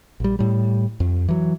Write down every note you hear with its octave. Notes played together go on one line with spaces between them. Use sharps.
A#1 G3
A2 G3
F2
E3 F#3